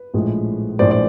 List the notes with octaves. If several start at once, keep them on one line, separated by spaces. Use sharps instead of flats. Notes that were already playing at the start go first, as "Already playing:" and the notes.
Already playing: B4
A#1 A2 F3 G#3
A#1 A2 F3 G#3 C5 D5
D5